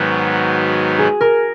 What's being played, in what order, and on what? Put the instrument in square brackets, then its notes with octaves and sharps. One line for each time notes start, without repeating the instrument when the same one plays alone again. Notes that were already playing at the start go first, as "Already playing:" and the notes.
Already playing: [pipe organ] G#2 D#3 F#3 B3 [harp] F#4
[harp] G#4
A#4